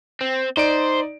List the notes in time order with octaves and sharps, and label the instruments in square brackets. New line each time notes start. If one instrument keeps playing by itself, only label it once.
[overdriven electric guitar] C4
[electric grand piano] D#4 D5 D7 [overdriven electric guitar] C5